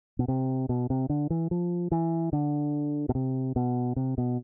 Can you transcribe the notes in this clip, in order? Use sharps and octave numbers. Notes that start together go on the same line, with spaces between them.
B2
C3
B2
C3
D3
E3
F3
E3
D3
B2
C3
B2
C3
B2